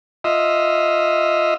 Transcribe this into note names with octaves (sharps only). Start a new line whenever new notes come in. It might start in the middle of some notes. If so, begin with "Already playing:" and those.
F4 D#5 E5